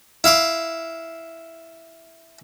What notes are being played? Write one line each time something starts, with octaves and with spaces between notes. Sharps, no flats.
E4 F5 C6 D6